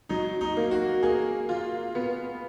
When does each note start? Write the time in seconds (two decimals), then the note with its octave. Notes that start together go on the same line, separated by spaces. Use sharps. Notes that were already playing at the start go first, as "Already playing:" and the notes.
0.09 F#3 D#4
0.41 D#4
0.57 A#3
0.71 F#4
1.03 A#3 G#4
1.49 F4
1.95 B3